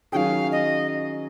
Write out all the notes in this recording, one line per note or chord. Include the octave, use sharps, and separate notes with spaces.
D#3 F#3 C#4 G#4 F5 G5
D#5